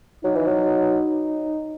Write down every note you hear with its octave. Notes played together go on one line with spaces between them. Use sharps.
F#3 D#4
E3
F#3